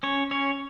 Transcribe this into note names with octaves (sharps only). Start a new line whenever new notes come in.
C#4 C#5
C#4 C#5